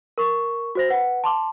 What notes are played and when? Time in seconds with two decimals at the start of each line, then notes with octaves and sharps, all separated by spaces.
0.18 A#4 C#6
0.75 F#4 C5 A#6
0.89 B4 F#5
1.24 A5 C6 D6